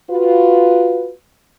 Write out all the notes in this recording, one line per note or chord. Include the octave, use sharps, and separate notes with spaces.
F4 F#4 B4